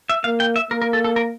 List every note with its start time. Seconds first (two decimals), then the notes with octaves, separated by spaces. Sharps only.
0.09 E5
0.24 A#3 F5
0.40 G5
0.56 E5
0.71 A#3 A#4
0.82 A#4
0.93 A4
1.04 A4
1.16 A#4